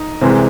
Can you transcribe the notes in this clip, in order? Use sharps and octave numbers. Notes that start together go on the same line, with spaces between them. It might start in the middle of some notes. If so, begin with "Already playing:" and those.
Already playing: D#4
C2 C3 E3 G#3 C4